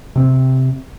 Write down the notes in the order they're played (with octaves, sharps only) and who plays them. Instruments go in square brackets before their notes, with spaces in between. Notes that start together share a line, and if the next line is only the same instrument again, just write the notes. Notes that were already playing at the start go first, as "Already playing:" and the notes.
[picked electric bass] C3 C4